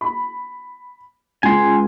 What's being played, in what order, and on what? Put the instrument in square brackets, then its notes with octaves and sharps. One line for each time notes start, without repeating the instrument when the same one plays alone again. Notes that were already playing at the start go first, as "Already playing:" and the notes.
[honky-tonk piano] B5
[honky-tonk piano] C#2 [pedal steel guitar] G#5 C6